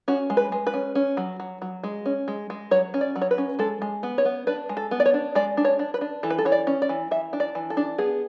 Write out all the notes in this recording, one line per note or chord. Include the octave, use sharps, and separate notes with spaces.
C#4 F#4
G#3
B4
G#3
B4
C#4
C#4
F#3
F#3
F#3
G#3
C#4
G#3
G#3
F#3 C#5
C#4
D5
F#3
C#5
B4
C#4
G#3 A4
G#3
B3
C#5
B3
D4 B4
G#3
A4
B3
D5
C#5
D4
G#3 D5
D4
C#5
D4
B4
D4
E3 A4
B4
A4
E3 C#5
D5
C#4
D5
E3
E3 E5
D4
D5
E3
A4
D4
B3 G#4